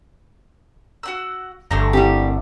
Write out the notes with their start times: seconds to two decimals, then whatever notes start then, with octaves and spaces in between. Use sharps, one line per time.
1.03 F#4 F#5 E6
1.71 G1 A3 D4 A#5
1.93 G3 A#3 C4 E4 G4